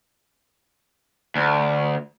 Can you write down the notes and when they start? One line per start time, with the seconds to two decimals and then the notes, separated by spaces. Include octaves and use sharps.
1.36 D2